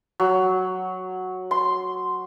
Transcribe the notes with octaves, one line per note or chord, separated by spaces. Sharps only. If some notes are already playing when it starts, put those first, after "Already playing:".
F#3
C6